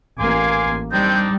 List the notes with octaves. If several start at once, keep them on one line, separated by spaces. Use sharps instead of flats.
A1 A#3 F5 G#5 C6 D6
G3 C4 D4 D#4 G6